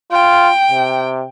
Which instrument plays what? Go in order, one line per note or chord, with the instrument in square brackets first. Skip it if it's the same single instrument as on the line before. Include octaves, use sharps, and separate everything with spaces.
[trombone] F4 [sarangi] G5
[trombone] C3